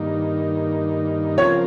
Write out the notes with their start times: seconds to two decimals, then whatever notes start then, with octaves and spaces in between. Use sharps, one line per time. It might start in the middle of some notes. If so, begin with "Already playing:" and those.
Already playing: G2 D#3 A#3 D#4
1.37 C#3 F3 C4 F4 A#4 C#5